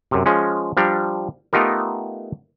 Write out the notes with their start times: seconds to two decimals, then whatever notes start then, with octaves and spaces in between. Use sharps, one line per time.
0.11 F#2 C3
0.26 F3 G#3 C#4
0.77 F3 G3 D4 A#5
1.53 A3 B3 D#4 F4 G4 A#4